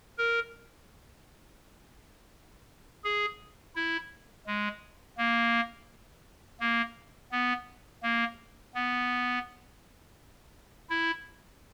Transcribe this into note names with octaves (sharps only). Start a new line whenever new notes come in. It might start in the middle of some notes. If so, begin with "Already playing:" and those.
A#4
G#4
E4
G#3
A#3
A#3
B3
A#3
B3
E4